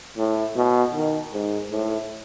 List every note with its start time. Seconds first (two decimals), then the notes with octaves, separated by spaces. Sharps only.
0.17 A2
0.56 B2
0.95 D#3
1.33 G#2
1.71 A2